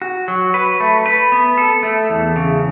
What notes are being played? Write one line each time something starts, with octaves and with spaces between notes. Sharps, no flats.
F#4
F#3
B4
A3
B4
B3
A4
A3
E2
C#3